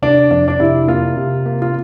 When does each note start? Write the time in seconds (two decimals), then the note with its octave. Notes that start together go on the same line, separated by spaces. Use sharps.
0.02 C3 D4
0.31 F2 D4
0.48 D4
0.60 C3 E4
0.88 A#3 F4
1.17 C3
1.46 A#3
1.62 F4